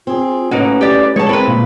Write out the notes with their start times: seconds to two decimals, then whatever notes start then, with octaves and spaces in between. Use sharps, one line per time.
0.07 C4 F4 G#4
0.51 A2 A#3 C#4 D#4 F#4 B4
0.81 G4 D5
1.16 G#3 E4 C#5 A5
1.29 C4 E4 A#4 B4 A#5
1.47 A#2 F4 F5